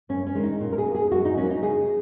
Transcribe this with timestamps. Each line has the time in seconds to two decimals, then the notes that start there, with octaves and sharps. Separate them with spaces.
0.09 F#2 C#4
0.26 C#4
0.35 D#3 G#3
0.43 D#4
0.61 A#2
0.72 A#4
0.78 G#4
0.86 A#3
0.95 G#4
1.12 F#2 F#4
1.25 D#4
1.37 F#3 A#3 C#4
1.50 D#4
1.63 C#3 G#4